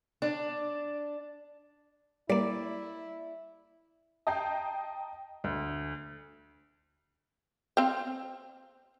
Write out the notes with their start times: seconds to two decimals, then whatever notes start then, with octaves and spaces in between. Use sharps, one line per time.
0.22 D4
2.30 G3 A#3 E4 D5
4.27 D#5 G5 A5 A#5 G6 C7
5.44 D2
7.77 C4 F5 G5